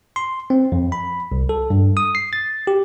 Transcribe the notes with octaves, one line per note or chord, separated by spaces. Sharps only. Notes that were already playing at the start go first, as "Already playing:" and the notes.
C6
C4
F2
B5
C2
A4
G2
D#6
C7
A6
G4